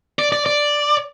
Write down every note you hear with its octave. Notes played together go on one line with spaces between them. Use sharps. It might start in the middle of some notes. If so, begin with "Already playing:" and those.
D5
D5
D5